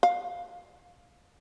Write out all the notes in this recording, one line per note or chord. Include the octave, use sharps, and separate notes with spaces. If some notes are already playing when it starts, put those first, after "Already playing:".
F5